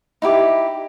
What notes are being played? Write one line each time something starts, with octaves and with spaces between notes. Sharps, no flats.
D#4 E4 G4 D6